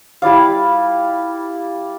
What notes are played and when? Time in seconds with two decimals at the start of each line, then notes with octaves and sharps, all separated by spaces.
0.22 G3 E4 D5 F5